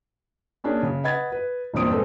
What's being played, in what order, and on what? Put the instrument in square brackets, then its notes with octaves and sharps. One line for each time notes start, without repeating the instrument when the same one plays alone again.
[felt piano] A#3 C#4 D4 G#4
C#3
B4 D#5 F#5 B5 G#6 A6
B4
E1 G2 A#2 C4 D#6 D7
G#3 B3 C4 A4 B4 C5